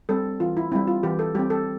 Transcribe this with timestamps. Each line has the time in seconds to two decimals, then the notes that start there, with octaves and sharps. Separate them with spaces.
0.09 G3 C4 A4
0.40 E3 F4
0.57 E4
0.72 G3 C4 E4
0.87 F4
1.03 E3 G4
1.19 A4
1.35 G3 C4 G4
1.50 A4